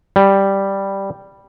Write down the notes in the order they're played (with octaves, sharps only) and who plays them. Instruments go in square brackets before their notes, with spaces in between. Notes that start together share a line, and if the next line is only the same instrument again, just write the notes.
[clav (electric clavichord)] G3